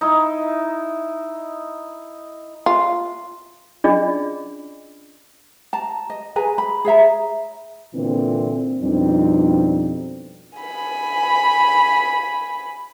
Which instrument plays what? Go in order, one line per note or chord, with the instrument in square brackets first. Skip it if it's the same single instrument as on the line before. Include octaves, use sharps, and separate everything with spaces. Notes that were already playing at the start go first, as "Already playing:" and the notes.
[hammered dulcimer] D#4 E4
[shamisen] F4
[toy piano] C#4 D4 F4 G#4 D5 D#5
[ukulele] A5 A#5
D#5
G#4 B4 G#5 A#5
B5
G#4 C#5 E5 A#5
[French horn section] A#2 D3 E3 C4
F2 B2 G3 C4 D4 D#4
[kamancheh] G#5 B5